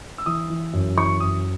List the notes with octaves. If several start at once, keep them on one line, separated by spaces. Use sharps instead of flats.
E6
E3 D#6
E3
F#2
E3 C#6
F#2 D#6